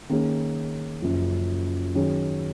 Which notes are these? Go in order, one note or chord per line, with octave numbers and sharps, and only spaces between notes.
D#3 A#3 C#4 G#4
F#1 F#2 F3
D#3 F#3 C#4 G#4